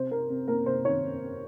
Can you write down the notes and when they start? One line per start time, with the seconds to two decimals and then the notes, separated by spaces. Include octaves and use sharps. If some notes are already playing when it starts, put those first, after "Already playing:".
Already playing: C3 C5
0.11 C3 A#4
0.30 C3
0.48 A#3 A#4
0.66 C3 C5
0.85 D#3 C#5